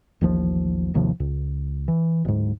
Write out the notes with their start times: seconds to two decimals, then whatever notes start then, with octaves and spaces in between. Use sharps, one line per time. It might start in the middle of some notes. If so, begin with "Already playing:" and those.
0.21 A1 D#2 F3
0.94 G#1 D#2 C3 F3
1.20 C#2
1.88 E3
2.25 D1 G#2